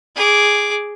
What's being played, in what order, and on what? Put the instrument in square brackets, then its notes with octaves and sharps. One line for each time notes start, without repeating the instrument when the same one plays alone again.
[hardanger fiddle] G#4 D6